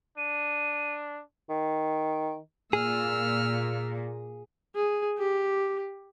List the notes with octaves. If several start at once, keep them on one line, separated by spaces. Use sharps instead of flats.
D4 D#7
D#3
A#2 A#3 G#4 E6 F6
G#4
G4